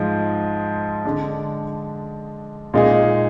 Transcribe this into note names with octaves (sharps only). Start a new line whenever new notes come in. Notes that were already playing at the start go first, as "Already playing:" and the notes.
Already playing: G#2 F3 G#3
D3 G#3 D4
A#2 G#3 D#4 G#4